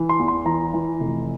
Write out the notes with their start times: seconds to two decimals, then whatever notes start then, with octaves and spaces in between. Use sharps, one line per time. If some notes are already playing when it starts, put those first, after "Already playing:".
Already playing: E3
0.09 C6
0.19 E2
0.28 C6
0.45 E3 A#5
0.74 E3
1.00 F1